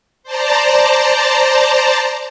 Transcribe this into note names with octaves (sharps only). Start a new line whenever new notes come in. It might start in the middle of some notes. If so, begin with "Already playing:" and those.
C5 D5 A5 A#5